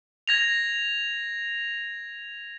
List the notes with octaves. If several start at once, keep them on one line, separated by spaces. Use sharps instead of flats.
G#6 A#6 F7